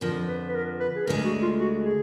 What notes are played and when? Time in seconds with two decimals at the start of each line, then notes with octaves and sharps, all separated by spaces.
0.01 F2 D3 F3 A#4
0.28 B4
0.48 B4
0.55 A#4
0.80 B4
0.95 G#4
1.06 D2 D3 G#3 A#4
1.25 F#4
1.42 F4
1.60 F#4
1.85 G#4